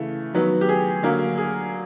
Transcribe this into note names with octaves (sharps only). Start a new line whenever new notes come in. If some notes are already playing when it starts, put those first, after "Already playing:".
Already playing: C#3 E3 A3
D#3 F#3 B3
G4
G#4
D3 F#3 A#3
G#4